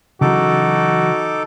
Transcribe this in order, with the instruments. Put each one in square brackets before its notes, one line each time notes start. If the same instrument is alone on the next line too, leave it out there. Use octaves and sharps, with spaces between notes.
[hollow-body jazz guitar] C#3 E3 F#3 [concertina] D#4 A4 D6 [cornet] F#4